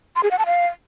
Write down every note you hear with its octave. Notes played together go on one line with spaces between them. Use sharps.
C6
G#4
F#5
A5
F5